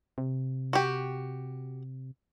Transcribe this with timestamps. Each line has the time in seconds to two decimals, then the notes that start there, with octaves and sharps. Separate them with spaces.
0.18 C3
0.73 F#4 G4